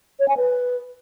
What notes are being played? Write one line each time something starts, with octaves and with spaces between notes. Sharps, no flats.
C#5
G#5
B4